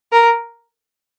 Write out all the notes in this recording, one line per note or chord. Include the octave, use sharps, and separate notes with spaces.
A#4